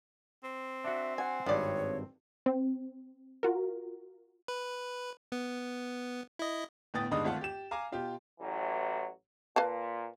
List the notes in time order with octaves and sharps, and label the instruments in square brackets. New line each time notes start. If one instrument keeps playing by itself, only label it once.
[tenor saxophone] C4
[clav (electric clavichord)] D4 F#4 [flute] E5
[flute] F#5 [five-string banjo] G#5
[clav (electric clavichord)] G#1 G2 [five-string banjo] B3 D5 [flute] C#5
[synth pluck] C4
F4 F#4 A#4
[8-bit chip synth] B4
B3
E4 D#5
[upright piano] G1 A2 B3 G5 D#6 A6
G2 D3 G#3 D4 D#4 D#6
G#1 A3 F4 A4 F#5 A5
G4 E7
F5 G#5 A#5 D6
B2 F4 G4
[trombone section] A1 E3 F#3
[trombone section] A#2 [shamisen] B4 F5 A5